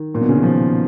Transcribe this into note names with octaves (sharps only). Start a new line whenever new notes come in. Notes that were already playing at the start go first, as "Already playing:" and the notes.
Already playing: D#3
A#2
B2
C#3
D#3
F3